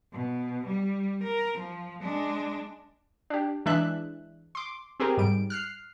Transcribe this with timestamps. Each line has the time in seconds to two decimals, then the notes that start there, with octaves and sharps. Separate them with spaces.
0.12 B2
0.67 G3
1.24 A#4
1.58 F3
2.03 G#3 D4
3.30 D4 G4
3.66 E3 G#3 D4 E5 F#6
4.55 C6 D6
5.00 C4 G4 G#4 A#4
5.17 G#2 G3 D7
5.50 F6 F#6 C7